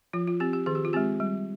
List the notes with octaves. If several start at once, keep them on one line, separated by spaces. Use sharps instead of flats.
F3 F4
F4
C4 G4
G4
D#3 G#4
G4
F4
G#3 C4 G4
G3